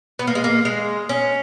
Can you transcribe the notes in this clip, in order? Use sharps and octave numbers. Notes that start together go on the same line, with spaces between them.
B3
A#3
G#3
A#3
G#3
C#4